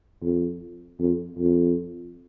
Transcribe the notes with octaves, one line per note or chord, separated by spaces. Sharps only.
F2
F2
F2